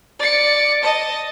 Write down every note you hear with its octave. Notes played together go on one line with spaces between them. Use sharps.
D5 C#7
D#5 A5